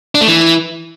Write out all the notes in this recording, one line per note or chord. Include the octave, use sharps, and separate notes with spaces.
D4
A3
E3